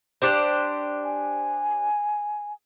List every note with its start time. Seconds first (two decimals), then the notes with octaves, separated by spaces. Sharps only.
0.22 D4 G4 C5
1.04 G#5